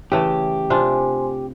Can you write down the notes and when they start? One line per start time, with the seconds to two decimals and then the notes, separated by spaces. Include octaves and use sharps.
0.12 C#3 E3 A3 G4
0.70 C3 D4 F4 C5 G#5 C6